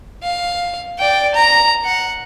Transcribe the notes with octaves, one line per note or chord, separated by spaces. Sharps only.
F5
D5 G5
A#5
F#5